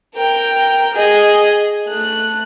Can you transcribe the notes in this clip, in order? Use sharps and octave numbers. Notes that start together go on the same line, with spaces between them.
A#4 G5
G#4 D#5
A3 F#6